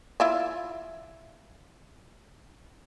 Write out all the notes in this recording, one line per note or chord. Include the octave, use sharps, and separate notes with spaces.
E4 F4 E5